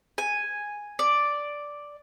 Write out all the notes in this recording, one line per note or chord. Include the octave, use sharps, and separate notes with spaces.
G#5
D5